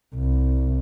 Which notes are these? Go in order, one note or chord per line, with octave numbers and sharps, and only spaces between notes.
C2